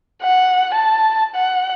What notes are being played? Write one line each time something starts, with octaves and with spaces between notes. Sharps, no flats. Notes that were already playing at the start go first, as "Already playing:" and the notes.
F#5
A5
F#5